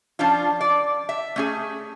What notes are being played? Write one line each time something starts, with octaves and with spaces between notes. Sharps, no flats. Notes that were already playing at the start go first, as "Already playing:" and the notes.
F3 C#4 D4 F4
D5
E5
A3 C#4 G#4